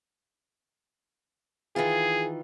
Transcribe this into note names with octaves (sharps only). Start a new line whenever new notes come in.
D#3 E3 F4 G#4